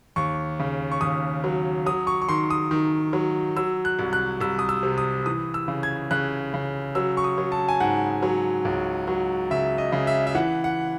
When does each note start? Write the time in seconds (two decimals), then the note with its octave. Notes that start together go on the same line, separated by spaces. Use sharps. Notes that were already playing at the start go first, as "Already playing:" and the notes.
0.16 D#2 C#6
0.60 C#3
0.92 C#6
1.01 D#2 D#6
1.44 F#3
1.86 F#3 D#6
2.07 C#6
2.22 C#6
2.29 D#3 C6
2.50 D#6
2.71 D#3
3.13 F#3
3.57 F#3 E6
3.85 F#6
3.99 C2
4.13 F#6
4.41 C2 E6
4.59 D#6
4.69 E6
4.83 C3
4.98 D#6
5.26 E3 D#6
5.54 E6
5.68 C#3
5.83 G#6
6.11 C#3 F#6
6.54 C#3
6.95 F#3 E6
7.17 C#6
7.24 D#6
7.38 F#3
7.52 A5
7.69 G#5
7.80 G#2 F#5
8.23 F#3
8.65 C#2
9.08 F#3
9.51 C#3 E5
9.78 D#5
9.92 C#3
10.07 E5
10.27 E5
10.35 E3 F#5
10.64 F#5